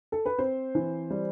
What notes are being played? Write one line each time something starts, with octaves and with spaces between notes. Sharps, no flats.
A4
B4
C4 C5
E3
G3